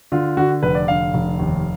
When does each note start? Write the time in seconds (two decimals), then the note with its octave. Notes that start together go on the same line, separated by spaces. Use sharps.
0.12 D3 F4
0.37 D3 F#4
0.63 F1 B4
0.75 D5
0.88 D3 F5
1.14 F1
1.39 D#2